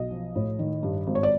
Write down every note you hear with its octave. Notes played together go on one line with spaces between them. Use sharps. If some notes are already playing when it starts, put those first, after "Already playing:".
Already playing: B1 D#5
F3
A2
D#3
G2
G#1
C#5
D5